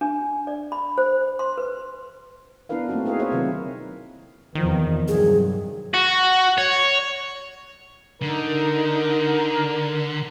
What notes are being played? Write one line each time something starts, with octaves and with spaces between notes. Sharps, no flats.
D4
D5
B5
C5
C6
B4
B3 D4 E4 A#4 B4 F5
A3 A#3 C4 D#4 F#4
E4 G#4 A#4 B4 F5
D#4 G#4 A#4 C5 C#5 E5
C3 D#3 F#3 C4 F4 B4
E2 C3 D#3 F3
G2 C3 F#3 G#4
F#4
C#5
D3 D#4 A#4